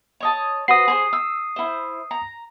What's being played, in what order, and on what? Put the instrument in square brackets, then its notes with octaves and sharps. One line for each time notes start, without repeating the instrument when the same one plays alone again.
[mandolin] C#5 D#5 A5
[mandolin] F#4 B4 C5 [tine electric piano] D#6 C7
[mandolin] G#4 C5
E6
E4 C5
A#5